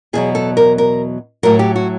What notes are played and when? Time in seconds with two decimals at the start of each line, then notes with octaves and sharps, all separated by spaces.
0.13 E2 B2 F#3 G#4
0.35 A4
0.57 A#4
0.78 A#4
1.43 A2 F#3 A#4
1.59 G4
1.76 F#4